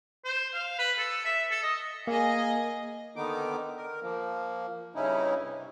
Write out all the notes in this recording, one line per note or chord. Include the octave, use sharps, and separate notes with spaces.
C5
F5
B4
A4
E5
A4
D#5
A#3 G#4 D#5
D3 D#3 B3 D#4 D6
A#4
F3 A#3
G2 C#3 C#4 D#4 E4
C3